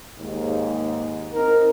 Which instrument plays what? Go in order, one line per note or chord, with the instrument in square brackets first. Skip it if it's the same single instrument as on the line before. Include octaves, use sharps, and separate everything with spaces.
[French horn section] D#2 G#2
[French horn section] C4 D#4 [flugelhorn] A#4